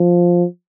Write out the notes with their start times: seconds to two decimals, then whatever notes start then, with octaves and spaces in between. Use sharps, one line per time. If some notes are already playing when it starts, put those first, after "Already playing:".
Already playing: F3